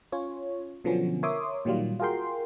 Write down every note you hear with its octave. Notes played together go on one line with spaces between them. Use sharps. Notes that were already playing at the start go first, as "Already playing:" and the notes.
C#4 F4 C#5
B2 D3 F3 F#3 B3 C#4
A#4 C#5 E5 C6 D6 D#6
A#2 D#3 F#3 G3 F4
F4 F#4 G#4 A#4 G5 C6